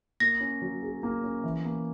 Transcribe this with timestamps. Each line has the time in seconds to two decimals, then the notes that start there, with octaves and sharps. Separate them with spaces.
0.20 A#3 A#6
0.40 C#4
0.62 F#3
0.83 G#4
1.03 A#3
1.23 C#4
1.44 E3
1.65 A#3